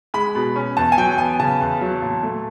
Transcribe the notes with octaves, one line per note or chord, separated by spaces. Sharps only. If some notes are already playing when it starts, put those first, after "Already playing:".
G#3 B5
B2
C#4
E2 A5
G#5
F#3 G5
B3 G#5
C#3 A5
E2
F#3
A#2
A3